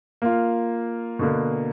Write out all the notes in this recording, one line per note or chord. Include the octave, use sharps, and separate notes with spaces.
A#3 F4
B2 D3 A#3